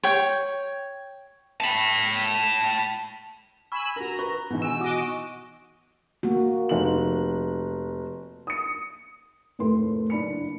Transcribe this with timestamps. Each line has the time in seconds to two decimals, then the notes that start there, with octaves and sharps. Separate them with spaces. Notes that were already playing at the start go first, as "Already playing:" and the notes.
0.04 C#5 G5
1.61 A5 B5
3.72 G#5 B5 C#6 E6
3.96 F#4 A#4 A#5
4.19 B4 C#6
4.50 G#2 B2 E3 D#4
4.62 G#5 E6 E7
4.80 F#4 D#5 D6
6.23 A#3 F#4
6.69 F1 F#7
8.47 D#6 C#7
9.59 F1 A2 A3 A#4 B4 C6
10.10 F#1 D4 B5 C#7